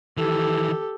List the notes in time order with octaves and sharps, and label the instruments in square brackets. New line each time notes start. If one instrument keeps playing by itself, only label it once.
[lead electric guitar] D#3 E3 [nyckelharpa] G4 A4